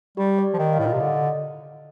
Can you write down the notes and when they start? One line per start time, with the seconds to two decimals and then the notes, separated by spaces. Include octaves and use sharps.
0.17 G3 G4
0.39 D5
0.54 F3
0.59 D#3 D#5
0.73 F5
0.79 A2
0.87 A#2
0.94 C3 D5
1.01 D3 D#5